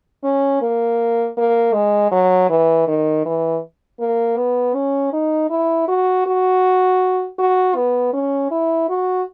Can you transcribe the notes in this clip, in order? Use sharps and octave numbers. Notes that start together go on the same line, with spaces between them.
C#4
A#3
A#3
G#3
F#3
E3
D#3
E3
A#3
B3
C#4
D#4
E4
F#4
F#4
F#4
B3
C#4
E4
F#4